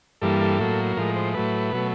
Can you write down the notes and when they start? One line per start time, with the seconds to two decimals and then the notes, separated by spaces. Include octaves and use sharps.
0.22 G2 E3 G3 A#3 A4
0.41 A4
0.60 A2 F#3 A#3
0.97 A2 F3 G#3 A#4
1.16 C5
1.34 A2 F#3 A3 B4
1.73 B2 F#3 A3